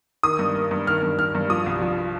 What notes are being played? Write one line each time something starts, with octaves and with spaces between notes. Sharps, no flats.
D#3 D#6
G2
A#3
G2
D#3 F6
G2
D#3 F6
G2
F3 D#6
C2
F3